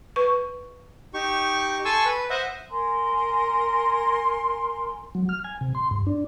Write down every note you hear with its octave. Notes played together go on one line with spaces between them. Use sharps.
B4 C#6
D#4 G4 C#6
A4 G#5 A5 C6 C#6 E6
B4
C5 D#5 E5 F#5
A#4 G#5 A#5 C6
F#3
F6
G#5
C3
C6
G2
D4